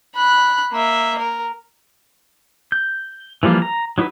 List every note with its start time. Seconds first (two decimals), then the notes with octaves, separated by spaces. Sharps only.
0.15 B5 F#6
0.72 A#3 E5
1.19 A#4
2.72 G6
3.43 E3 F3 G3 A#3 F4
3.62 A#5
3.98 F#3 D#4 E4 F#4 B4